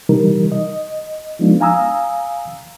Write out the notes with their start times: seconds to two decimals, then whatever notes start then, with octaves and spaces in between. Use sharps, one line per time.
0.09 C3 E3 G3 D#4 A#4
0.52 D#5
1.39 F3 G#3 B3 D4 D#4 F4
1.60 F5 G#5 A#5 D#6 E6